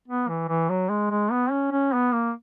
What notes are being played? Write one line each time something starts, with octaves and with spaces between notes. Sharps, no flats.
B3
E3
E3
F#3
G#3
G#3
B3
C#4
C#4
B3
A#3